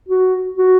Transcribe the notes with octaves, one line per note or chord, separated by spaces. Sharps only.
F#4
F#4